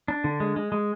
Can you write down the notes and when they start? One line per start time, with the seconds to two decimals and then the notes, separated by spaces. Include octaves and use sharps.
0.08 D4
0.24 D3
0.40 G#3
0.56 G#3
0.72 G#3